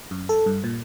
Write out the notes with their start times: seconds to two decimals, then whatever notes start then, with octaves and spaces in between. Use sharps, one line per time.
0.11 F#2
0.29 A4
0.46 G2
0.64 A#2